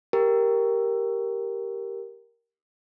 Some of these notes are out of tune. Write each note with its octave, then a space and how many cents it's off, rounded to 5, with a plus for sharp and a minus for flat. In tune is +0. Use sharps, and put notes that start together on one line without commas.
G4 +0 A#4 +0